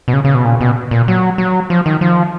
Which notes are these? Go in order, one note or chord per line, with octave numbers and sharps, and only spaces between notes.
B2
C#3
C#3
B2
A#2
B2
A#2
F#3
F#3
F3
D#3
F3